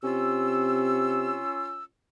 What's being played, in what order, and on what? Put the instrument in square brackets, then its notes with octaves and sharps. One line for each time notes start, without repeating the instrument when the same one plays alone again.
[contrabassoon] C3 [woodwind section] C#4 F4 E6